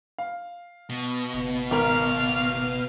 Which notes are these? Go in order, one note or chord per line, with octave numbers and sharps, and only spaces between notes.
F5
B2
F#1
G#1 A#4 F5 F7